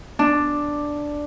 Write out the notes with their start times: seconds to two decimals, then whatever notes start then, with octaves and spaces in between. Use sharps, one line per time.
0.19 D4